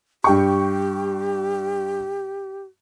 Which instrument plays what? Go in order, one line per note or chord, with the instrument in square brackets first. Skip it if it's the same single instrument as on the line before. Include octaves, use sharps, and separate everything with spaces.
[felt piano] G2 G5 C#6 [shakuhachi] G4